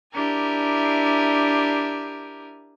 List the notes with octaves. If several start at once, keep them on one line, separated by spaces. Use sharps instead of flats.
D4 E4 G4 A#4 G#5